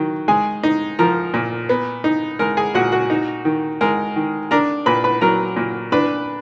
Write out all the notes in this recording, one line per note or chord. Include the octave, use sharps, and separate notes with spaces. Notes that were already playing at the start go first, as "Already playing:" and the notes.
Already playing: D#3 F#3
G#3 G#4 G#5
D#4
F3 A#4 A#5
A#2
B3
D#4
G#3 A#4 A#5
G#4 G#5
A#2 F#4 F#5
F#4 F#5
D#4
D#3
G#3 A#4 A#5
D#3
D4 A#4 A#5
A#2 B4 B5
B4 B5
F#3 A#4 A#5
A#2
D4 B4 B5